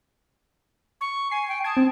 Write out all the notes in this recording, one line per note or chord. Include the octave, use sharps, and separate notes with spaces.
C#6
G#5 C7
G5
A5 D#6 G#6
C4